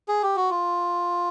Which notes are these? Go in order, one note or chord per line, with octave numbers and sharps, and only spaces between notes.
G#4
G4
F#4
F4